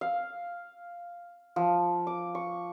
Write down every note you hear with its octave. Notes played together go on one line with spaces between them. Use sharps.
F5
F3
D6
C#6